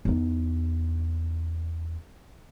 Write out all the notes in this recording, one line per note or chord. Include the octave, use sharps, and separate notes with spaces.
E2 D#4